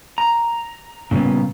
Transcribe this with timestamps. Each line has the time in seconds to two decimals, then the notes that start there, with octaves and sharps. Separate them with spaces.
0.18 A#5
1.11 A#2 C#3 G3 A#3 B3